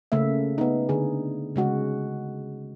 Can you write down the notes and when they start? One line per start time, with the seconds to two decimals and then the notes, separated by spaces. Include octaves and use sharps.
0.12 C#3 A3 A#3 E5
0.58 B3 D#4
0.89 D3 G#4
1.56 C#3 G#3 F#4